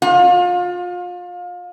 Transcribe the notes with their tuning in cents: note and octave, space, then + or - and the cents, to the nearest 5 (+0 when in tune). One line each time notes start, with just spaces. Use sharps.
F4 +30